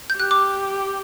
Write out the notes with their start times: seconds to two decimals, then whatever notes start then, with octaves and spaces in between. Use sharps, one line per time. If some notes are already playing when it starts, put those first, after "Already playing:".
0.10 G6
0.18 G4 F#6
0.31 D6